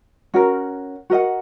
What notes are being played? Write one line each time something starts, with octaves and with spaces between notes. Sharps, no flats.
C#4 F#4 A#4
F#4 A#4 D#5 F#5